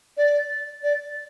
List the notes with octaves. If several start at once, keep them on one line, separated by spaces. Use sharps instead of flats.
D5
D5